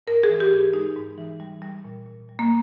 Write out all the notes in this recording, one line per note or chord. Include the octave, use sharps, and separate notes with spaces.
G#2 A#4
G#4
E3
G4
G#2
G#3 D#4
G#2
E3
G3
G3
A#2
A#2
G3
A#3